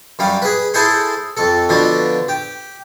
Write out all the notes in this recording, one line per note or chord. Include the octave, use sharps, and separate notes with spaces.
F#2 G3 F5
G#4 B4
E4 G#4 A4 C5 G#5 C6
F2 A4
B2 D3 F3 D4
G4